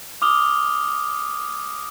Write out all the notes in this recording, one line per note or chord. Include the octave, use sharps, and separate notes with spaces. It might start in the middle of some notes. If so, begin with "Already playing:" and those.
D6 D#6 F6 F7 G7